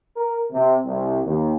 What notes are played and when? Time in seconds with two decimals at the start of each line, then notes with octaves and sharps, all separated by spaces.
0.17 A#4
0.51 C3
0.85 C2
1.24 D#2